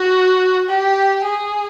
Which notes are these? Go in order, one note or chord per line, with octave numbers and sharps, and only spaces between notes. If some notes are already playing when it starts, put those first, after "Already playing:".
Already playing: F#4
G4
G#4